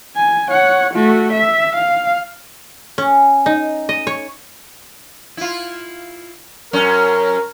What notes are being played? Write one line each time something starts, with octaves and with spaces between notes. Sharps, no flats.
G#5
C#5 F#5
A3 F#4
E5
F5
C#4
D#4
D#5
C#5
E4 F4
F#2 C#4 A#4